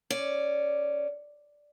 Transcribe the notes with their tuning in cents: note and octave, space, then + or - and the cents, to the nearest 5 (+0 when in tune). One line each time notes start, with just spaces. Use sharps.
C#4 +0 D5 +0